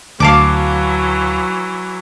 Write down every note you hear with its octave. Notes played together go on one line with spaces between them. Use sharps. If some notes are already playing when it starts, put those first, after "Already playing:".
D2 E3 F#3 F5 A5 D6